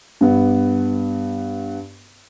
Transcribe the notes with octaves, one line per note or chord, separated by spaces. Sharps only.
G2 B3